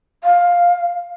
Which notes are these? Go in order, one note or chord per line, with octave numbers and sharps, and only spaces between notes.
F5